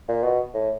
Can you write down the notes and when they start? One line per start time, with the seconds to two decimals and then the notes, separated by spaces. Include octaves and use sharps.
0.09 A#2
0.23 B2
0.54 A2